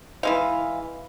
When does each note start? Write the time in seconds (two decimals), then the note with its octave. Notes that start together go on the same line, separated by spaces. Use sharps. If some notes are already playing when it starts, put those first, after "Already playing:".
0.23 E3 G#3 F5